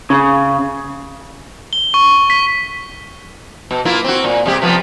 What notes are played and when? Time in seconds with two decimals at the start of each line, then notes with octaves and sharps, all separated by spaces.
0.10 C#3
1.73 G7
1.94 C#6
2.30 B6
3.71 B2
3.85 A#3 E4 F4
4.04 C4 F#4
4.24 A#2
4.46 C3 G#3 G4
4.62 C3 F3 B3